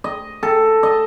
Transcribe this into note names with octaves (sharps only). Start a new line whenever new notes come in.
D#5
A4
D#5